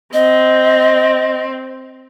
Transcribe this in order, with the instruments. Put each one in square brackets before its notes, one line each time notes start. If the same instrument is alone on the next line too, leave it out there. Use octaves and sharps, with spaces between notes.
[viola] C4 [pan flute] D#5